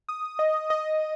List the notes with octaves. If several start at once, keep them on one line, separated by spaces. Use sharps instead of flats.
D#6
D#5
D#5